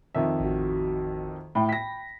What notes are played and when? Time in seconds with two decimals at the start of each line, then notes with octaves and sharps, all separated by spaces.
0.15 F2 D#3 E5
0.40 A1 F#4
1.55 A2 G5 B5
1.69 A#6 B6